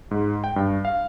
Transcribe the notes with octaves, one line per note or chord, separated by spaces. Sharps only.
G#2
G5
G2
F5